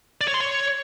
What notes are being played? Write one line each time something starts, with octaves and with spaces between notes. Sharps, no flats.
D5
C#5
C6
C#5